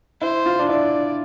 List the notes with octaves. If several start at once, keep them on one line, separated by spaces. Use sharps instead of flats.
E4 C5
F4
D4
E4 D5